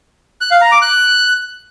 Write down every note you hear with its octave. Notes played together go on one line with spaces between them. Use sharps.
F#6
F5
A#5
D6
F#6